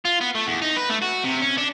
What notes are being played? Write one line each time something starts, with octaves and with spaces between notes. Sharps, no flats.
F4
B3
A3
E2
D#4
B4
A3
F#4
C3
C#4
D4